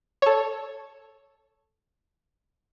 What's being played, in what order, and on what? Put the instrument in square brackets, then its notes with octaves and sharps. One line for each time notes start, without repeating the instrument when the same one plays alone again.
[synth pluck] A4 C#5